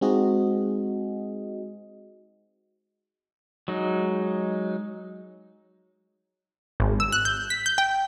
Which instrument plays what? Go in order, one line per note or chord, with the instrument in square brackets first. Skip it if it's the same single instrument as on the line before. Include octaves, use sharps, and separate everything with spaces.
[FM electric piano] G#3 C4 D#4 F#4 G#4 D#5
[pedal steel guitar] F#3 G#3 D#4
[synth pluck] G#1
E6
F#6
G6
B6
G6
G5